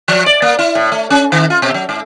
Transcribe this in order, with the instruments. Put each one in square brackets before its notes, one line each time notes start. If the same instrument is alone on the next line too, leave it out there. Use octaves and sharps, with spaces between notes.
[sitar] F3
D5
A#3
E4
A2
A3
C#4
D#3
F4
B2
F#3
G#2